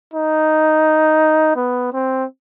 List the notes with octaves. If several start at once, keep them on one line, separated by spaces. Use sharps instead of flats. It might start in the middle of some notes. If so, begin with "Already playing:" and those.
D#4
B3
C4